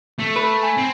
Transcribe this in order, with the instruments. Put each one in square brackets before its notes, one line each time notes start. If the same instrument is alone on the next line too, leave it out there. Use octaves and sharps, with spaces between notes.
[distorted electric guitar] A3
[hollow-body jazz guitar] B4
[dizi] G#5
[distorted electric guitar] C4